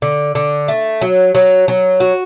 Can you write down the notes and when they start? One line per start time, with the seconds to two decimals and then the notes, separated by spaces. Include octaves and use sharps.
0.02 D3
0.35 D3
0.68 A3
1.01 F#3
1.35 F#3
1.68 F#3
2.00 F#4